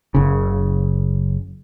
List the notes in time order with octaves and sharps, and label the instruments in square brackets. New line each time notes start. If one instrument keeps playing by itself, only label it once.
[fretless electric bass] F#1 C#3